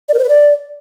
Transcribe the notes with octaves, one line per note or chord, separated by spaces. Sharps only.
D5
A#4
C5
B4
D5